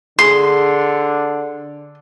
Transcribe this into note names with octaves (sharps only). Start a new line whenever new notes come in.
D3 G#4 C6